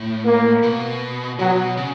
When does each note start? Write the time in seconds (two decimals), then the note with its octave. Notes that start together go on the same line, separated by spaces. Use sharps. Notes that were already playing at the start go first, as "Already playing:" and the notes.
Already playing: A2
0.25 A#3
0.63 B2
1.39 B2 F#3
1.77 C#3